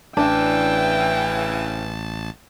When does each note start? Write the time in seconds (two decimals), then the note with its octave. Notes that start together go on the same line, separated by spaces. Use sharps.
0.17 A1 C#3 E3 D4 G5 A5